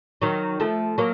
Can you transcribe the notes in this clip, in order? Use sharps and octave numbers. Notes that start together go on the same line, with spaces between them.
D#3 F#3
F3 A3
F#3 A#3